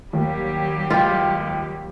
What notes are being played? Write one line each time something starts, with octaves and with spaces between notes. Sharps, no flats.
D#2 F#3 G3 G4
C#2 F4 G5